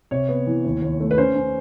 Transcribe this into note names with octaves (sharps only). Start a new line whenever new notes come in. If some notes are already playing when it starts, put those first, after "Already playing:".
C3 C#5
B3
E3
D#2
D#2
A3
B4
C#4 C5
C#4